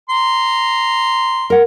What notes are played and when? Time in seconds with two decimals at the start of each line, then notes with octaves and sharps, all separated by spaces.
0.09 A#5 C6
1.50 A#4 F#5